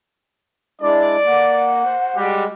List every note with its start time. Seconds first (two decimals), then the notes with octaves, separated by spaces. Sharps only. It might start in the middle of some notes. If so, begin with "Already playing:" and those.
0.82 G#3 D4 E4 D5
1.26 A#3 F#5
1.85 C5
2.15 G3 G#3 F#4 G4